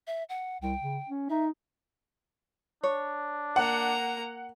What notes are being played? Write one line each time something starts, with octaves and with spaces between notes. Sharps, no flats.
E5
F#5
C2 G5
C#3
C#4
D#4 E5
D4 C#5
A#3 F#5 A#5